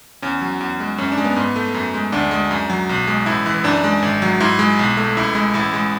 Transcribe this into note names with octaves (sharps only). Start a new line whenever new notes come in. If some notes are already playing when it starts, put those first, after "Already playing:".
E2 C#4
F#3
E2
G#3
F#2 C#4
D4
G#3
B3
G#2 B3
A3
F#2
G#3
D2 D4
G#3
F#2
F#3
B1
G#3
A1 E4
E3
F#2 D4
G#3
G#1
F#3
G#2 E4
G#3
B1
A3
C#2 E4
G#3
A1 E4
G#3